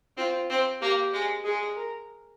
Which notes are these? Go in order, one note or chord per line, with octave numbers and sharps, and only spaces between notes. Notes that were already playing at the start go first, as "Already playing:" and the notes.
C4 F4
C4
A#3 G4
G#3
G#3 G#4
A#4